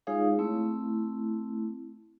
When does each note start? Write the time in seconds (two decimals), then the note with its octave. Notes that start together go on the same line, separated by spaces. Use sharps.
0.07 G#3 D#4 F4 G#4 C#5 F5
0.39 A3 C4 E4